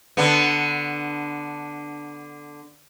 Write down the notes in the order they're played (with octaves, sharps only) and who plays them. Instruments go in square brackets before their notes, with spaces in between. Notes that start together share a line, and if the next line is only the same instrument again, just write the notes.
[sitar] D3 B3